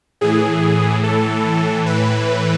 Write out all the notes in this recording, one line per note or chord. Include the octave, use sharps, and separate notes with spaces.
A2 E3 G#4
A4
B4